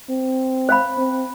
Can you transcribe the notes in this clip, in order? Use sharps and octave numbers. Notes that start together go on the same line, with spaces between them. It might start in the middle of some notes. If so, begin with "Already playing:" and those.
C4
C5 F5 B5
C4